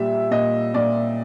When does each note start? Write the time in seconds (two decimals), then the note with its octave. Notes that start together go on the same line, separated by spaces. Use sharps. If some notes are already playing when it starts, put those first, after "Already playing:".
Already playing: A#2 G3 E5
0.31 A#2 D#5
0.74 A#2 D5